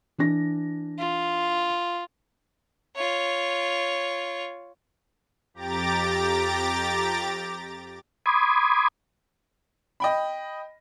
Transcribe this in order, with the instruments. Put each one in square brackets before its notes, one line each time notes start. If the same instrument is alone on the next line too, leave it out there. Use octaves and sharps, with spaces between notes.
[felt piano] E3 D4 A#6
[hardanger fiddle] F4
[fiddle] F4 C#5
[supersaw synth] F2 G4 A#5 D6 A6
[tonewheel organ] B5 C6 D6 D#6 G#6
[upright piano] D#5 G5 B5